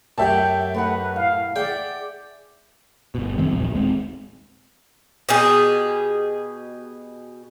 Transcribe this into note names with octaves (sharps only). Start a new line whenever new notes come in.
F#2 A3 G4 E5 F#5 G5 A5
A3 D#4 B4 F#5
A2 F5
G#4 D5 E5 F#5 G5
G1 B2
F#2 D#3 G3 C4
D#1 A#1 E2
D#1 G#3 C4
B2 G4 G#4